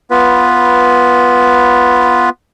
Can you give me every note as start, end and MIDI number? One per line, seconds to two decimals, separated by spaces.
0.11 2.29 59
0.11 2.29 65
0.11 2.29 71